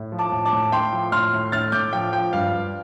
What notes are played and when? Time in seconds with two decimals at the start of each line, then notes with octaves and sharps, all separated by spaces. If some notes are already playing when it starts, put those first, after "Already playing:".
Already playing: A2
0.12 F3
0.19 A5 D6
0.32 A2
0.45 A5 D6
0.52 A2
0.72 A2 G5 C6
0.93 F3
1.12 A2 C6 F6
1.33 A2
1.52 A2 F6 A6
1.72 A2 D6 G6
1.93 F3 G5
2.13 F3 G5
2.33 G2 F5
2.52 G2